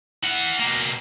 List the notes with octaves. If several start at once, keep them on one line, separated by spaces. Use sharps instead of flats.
E4 F#5
B2 A#3